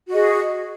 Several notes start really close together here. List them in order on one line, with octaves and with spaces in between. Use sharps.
F#4 D#5 G#4